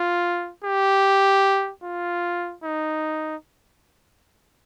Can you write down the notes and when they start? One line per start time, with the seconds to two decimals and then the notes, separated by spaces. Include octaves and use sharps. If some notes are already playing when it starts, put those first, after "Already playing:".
Already playing: F4
0.64 G4
1.83 F4
2.64 D#4